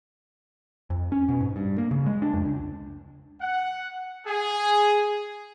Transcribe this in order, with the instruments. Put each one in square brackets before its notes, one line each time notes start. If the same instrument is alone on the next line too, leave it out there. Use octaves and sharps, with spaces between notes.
[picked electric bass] F2
C#4
B2
G#2
G2
A#3
C#3
G#3
D4
F2
C#2
[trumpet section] F#5
G#4